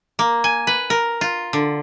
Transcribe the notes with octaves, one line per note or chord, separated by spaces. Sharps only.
A#3
G#5
B4
A#4
F4
D3